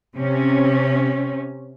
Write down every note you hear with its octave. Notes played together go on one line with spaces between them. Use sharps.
C3 C#4